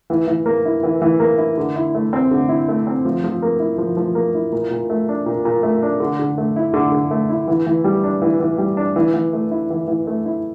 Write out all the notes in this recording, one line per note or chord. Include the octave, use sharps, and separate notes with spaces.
E3
E3
A#3
E4
E3
E3
A#3
E4
D3
E4
A3
C4
D3
E4
A3
C4
F3
F3
A#3
E4
F3
F3
A#3
E4
A#2
A#2
A3
D4
A#2
A#2
A3
D4
D3
D3
A3
E4
D3
D3
A3
E4
E3
E3
G3
D4
E3
E3
G3
D4
E3
E3
A3
E4
E3
E3
A3
E4